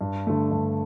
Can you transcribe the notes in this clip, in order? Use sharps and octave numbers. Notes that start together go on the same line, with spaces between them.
G2
D3 A3
G2